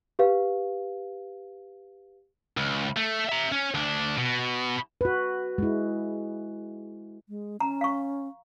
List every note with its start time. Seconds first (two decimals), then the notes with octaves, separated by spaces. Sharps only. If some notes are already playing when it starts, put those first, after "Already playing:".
0.19 G4 B4 F5
2.57 C#2
2.97 A3
3.29 E5 A#5
3.52 C#4
3.74 D2 D4
4.18 B2
5.01 F#4 B4
5.58 G#3 E4
7.29 G#3
7.60 C#4 A#5
7.81 F5 C#6